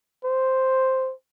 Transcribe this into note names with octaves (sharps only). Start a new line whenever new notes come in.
C5